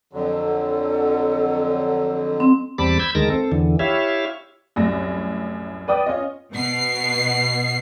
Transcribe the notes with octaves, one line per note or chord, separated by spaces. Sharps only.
F2 D3 F#3 A4
C4
E2 G3 C4 A5 B5 D6
B5 E6 G6 G#6
D2 D#3 G#3 A#4 A5 A#6
C4 A4
E2 D3 E3
E4 G4 C#5 E5 F5
C2 F#2 A2 A#6
B4 D5 G5 D#6
C#4 F4 D#5
B2 C7